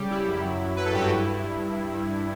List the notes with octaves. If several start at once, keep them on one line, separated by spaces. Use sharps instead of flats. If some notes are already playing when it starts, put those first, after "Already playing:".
Already playing: C#3 G3 G4
G3 E4
F#2
F#3
F#3
F#3 B4
A4
G2 G4
F#4
E4